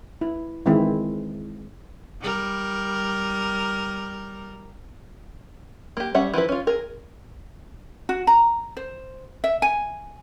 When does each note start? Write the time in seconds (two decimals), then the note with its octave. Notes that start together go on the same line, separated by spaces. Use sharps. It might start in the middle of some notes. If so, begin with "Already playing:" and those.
0.21 E4
0.66 D#3 E3 G#3 C4 E4
2.21 G3 A#4
5.97 A#3 G4
6.14 G3 C#4 E5 F#5
6.34 E3 F3 E4 B4
6.49 C#4 F4
6.67 G#4 A#4
8.09 F#4
8.27 A#5
8.77 C5
9.44 E5
9.62 G#5